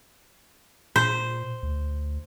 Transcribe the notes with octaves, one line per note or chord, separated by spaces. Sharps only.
A#2 C5
D2